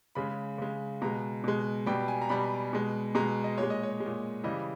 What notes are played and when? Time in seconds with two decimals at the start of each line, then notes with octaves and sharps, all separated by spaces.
0.15 C#3 G#3 B5
0.58 C#3 G#3
1.02 B2 G#3 A#5
1.44 B2 G#3
1.86 B2 G3 G5
2.08 G#5
2.22 A#5
2.29 B2 G3 B5
2.73 B2 G#3
3.15 B2 G#3 A#5
3.44 D#5
3.58 A#2 G#3 C#5
3.70 D#5
3.83 C#5
4.00 G#3
4.06 A#2
4.44 C#3 E3 G3 D#5